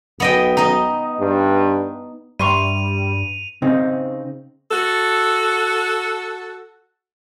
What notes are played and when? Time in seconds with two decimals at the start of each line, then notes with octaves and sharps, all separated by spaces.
0.20 B1 B3 D#5 G5
0.57 D#4 D#5
1.20 G2
2.39 G2 G3 E5 C6 C#6 D#7 F7
3.62 C#3 C4 D#4
4.71 F#4 A4